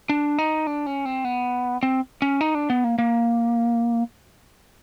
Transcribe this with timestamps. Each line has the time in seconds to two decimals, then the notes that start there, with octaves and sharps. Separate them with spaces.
0.10 D4
0.38 D#4
0.67 D4
0.86 C#4
1.05 C4
1.25 B3
1.83 C4
2.22 C#4
2.41 D#4
2.55 D4
2.70 B3
2.84 A#3
2.98 A#3